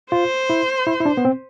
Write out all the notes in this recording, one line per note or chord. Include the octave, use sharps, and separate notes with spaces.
F4 C5
E4
E4
E4
D4
B3
C4